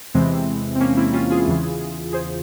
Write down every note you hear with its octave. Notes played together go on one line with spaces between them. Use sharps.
E2 C3 E3 G#3 C4
C4
A#3 C#4
C#4
C4 E4
C#4 F4
F4 G#4
E2 C#3 E3
G#4 C5